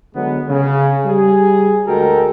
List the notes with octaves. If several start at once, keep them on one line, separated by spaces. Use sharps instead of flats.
D3 F#3 G#3 B3
C#3
G3 G#4
D2 G#3 F#4 A4 A#4 G5